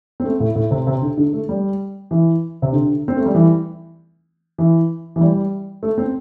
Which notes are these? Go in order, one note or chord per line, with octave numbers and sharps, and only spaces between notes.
C4
A3
A2
A2
C3
C3
D3
D3
A3
G3
E3
C3
D3
C4
A3
G3
E3
E3
E3
G3
A3
C4